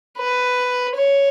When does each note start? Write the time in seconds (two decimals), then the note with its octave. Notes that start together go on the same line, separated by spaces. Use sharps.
0.18 B4
0.96 C#5